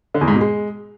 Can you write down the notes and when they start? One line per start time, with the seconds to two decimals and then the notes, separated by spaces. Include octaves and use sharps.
0.14 D3
0.21 E2
0.28 G#2
0.34 B2
0.41 G#3